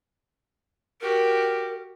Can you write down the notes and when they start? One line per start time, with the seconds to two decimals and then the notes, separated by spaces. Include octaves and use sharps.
1.01 F#4 G4 A#4